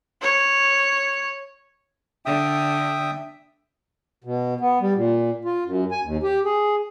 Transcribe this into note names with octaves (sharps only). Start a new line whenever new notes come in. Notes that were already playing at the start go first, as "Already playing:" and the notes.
C#5
D3 E5 G5 D#6
B2
B3
G3
A#2
F4
F#2
G#5
D#2
G4
G#4